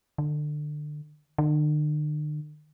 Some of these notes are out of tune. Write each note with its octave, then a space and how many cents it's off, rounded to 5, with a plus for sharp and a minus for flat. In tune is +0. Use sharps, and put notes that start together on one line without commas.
D3 +25
D3 +45